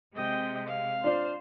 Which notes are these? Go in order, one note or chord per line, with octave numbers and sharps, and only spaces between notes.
C3 G#3 D#5 G5
F5
D4 F4 C5 D5